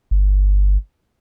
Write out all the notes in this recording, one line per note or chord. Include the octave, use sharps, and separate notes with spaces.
G1